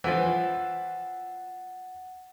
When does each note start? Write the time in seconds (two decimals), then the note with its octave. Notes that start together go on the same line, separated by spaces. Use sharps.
0.04 E3 F3 F#5 A6